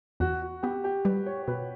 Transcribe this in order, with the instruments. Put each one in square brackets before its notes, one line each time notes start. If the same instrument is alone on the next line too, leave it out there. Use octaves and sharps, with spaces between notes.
[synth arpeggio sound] E2 [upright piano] F#4
[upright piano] F#4
[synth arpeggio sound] B3 [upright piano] G4
[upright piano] G4
[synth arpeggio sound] G3 [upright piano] B4
[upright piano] C#5
C#5
[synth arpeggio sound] B2 [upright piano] B4